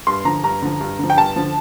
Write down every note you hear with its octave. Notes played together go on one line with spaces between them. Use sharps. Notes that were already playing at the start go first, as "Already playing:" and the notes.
G2 C6
D3 F3 A#5
G2 A#5
D3 F3
G2
D3 F3
G5
G2 A5
D3 F3